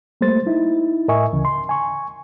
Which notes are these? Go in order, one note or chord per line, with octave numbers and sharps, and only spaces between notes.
G3 A3 A#3 C5 A6
D#4 E4
A2 A#4 D#5 E5 G#5 C#6
D2 C#3 E3
C6
G#5 C#6